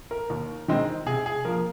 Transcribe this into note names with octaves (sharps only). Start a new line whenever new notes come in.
A#4
D#2
D#3 G#3 C4 D#4
C3 G#4
G#4
F3 A#3 A#4